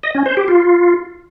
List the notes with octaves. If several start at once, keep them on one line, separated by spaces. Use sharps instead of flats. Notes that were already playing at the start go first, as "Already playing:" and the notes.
D#5
C#4
C5
G4
F4